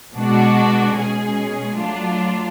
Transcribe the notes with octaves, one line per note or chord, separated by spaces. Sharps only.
B2 G#3 D4 F#4
B2 G#3 C#4 G#4
F#3 A3 D4 F4